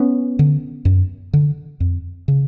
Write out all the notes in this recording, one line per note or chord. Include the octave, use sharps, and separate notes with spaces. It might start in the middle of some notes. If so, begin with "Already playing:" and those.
Already playing: B3 C#4
D3
F#2
D3
F2
C#3